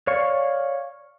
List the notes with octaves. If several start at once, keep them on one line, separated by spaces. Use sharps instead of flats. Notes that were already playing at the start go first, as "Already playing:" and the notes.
C#5 D5 F5 C#6